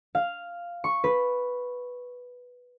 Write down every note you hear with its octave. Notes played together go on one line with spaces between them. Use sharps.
F5
C#6
B4